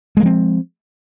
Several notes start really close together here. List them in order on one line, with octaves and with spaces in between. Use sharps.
G#3 A#3 F3 C4